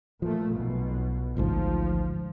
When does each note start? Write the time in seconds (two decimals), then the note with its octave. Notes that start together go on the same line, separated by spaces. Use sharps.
0.22 A#2 F3 A3
0.55 B1 B2
1.37 A1 D2 G#2 F3